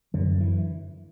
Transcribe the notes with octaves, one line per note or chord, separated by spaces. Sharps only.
F#2 D3
E3